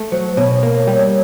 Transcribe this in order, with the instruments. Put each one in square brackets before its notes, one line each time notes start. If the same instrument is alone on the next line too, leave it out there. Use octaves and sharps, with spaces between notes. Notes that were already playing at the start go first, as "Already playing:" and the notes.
Already playing: [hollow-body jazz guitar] A3
[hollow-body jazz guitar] F#3 [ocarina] C5
[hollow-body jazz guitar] B2 [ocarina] C#5
[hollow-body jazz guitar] A#3
G3